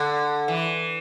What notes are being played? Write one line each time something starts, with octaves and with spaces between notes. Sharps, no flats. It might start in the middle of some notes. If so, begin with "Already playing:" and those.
Already playing: D3
E3